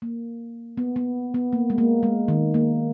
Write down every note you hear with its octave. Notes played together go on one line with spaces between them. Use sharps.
A#3
B3
B3
B3
A#3
G#3
A#3
G#3
D#3
A#3